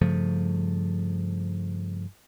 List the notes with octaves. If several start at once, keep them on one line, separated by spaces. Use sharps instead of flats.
G2 C#3 F3 A3